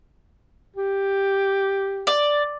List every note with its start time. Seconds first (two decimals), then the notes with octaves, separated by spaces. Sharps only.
0.77 G4
2.07 D5